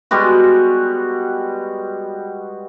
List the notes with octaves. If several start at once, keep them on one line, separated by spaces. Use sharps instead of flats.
G3 G#3 B3 F#4